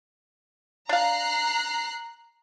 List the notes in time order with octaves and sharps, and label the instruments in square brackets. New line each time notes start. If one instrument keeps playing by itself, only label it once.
[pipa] D4 F5 [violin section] A#5 F#6 C7